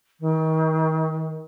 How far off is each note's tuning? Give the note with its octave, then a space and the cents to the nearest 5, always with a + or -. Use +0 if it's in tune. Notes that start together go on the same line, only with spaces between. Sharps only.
D#3 +35